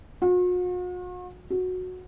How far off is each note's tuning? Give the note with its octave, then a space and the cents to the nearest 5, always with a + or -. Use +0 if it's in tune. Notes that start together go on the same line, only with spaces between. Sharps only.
F#4 -45
F#4 -10